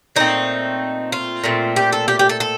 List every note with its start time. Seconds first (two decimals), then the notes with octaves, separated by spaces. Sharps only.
0.16 A#2 A3 C4 D#4
1.12 F4
1.44 A#2 A3 C4
1.76 G4
1.93 A4
2.08 G4
2.19 G4
2.29 A4
2.40 A4